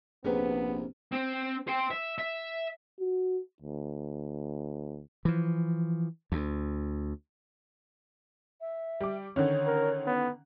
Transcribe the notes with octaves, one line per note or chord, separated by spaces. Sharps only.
A#1 C3 B3 C#4 G#4 A#4 B4
C4
C5 G5
E5
E5
F#4
D2
E3 F3
D2
E5
G3 D6
D3 D#3 C#4 C#5
A#4
B3